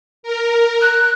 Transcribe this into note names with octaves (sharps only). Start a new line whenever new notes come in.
A#4
F#6